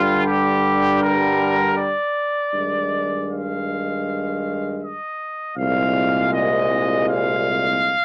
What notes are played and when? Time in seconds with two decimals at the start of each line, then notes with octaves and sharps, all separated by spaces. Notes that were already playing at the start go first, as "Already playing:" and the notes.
Already playing: G2 D3 G3 F4
0.26 G4
1.02 A#4
1.77 D5
2.54 G2 D#3 G#3
3.29 F5
4.81 D#5
5.57 C2 A#2 G#3 F5
6.32 D#5
7.09 F5